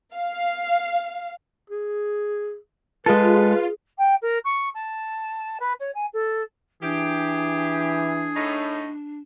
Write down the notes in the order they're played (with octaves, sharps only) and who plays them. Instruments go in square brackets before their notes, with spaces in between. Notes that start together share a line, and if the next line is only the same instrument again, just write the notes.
[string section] F5
[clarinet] G#4
[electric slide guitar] G#3 A4 [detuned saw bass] F4 [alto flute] G#4 [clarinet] B4
[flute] G5
A#4
C#6
A5
B4
C#5
G#5
A4
[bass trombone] E3 [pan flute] D4 [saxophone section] G4 [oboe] G#4
[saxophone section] A2 D#4